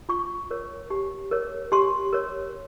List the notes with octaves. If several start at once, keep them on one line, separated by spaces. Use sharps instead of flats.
F4 C#6
A#4 C#5
G4
A#4 C#5
G4 C6
A#4 C#5